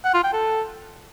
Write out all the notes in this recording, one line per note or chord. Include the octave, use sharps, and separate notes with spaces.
F#5
F4
G5
A4